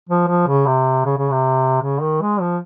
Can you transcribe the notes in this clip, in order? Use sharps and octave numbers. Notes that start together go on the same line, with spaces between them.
F3
F3
C#3
C3
C#3
C#3
C3
C#3
D#3
G#3
F3